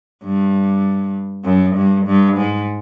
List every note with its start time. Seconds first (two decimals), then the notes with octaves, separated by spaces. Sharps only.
0.24 G2
1.45 F#2
1.76 G2
2.07 G2
2.38 G#2